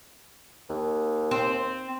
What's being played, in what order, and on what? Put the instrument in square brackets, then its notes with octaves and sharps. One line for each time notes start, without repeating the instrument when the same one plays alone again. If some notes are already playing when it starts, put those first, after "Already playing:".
[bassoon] D#2
[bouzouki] C4